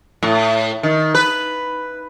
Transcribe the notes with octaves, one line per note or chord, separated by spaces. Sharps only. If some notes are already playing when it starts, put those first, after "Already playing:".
A2
D#3
B4